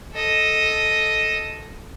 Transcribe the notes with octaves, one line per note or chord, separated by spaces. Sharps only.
A4 D#5